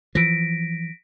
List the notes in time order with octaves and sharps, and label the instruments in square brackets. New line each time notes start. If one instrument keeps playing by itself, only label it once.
[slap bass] E3 F3 [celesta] A#6 B6 D7